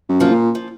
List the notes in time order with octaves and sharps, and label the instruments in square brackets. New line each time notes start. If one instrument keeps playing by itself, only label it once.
[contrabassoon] F#2
[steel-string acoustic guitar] C#3 F3 A#3 F4
[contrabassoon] A#2
[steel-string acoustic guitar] F3